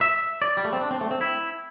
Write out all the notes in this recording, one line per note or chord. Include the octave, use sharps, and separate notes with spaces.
E5
D5
G3
A3
C4
D4
C4
A3
C4
E4